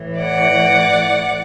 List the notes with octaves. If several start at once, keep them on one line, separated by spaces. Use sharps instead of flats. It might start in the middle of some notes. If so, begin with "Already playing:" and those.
Already playing: A2 E3
D5 F#5